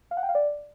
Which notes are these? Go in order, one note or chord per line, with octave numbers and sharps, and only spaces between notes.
F5
F#5
G5
F5
D5